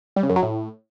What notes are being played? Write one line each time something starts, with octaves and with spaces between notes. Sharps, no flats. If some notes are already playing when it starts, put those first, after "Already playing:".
G3
C#3
F#2
F#3
A2